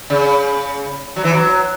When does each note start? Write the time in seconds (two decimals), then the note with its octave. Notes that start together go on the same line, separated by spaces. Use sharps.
0.10 C#3
1.16 F#3
1.24 E3
1.33 F#3